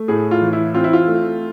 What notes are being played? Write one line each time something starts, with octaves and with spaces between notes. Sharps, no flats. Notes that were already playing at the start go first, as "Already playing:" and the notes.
Already playing: A3
A2 G#4
F4
E3
E4
C4 F4
E4
F4
A3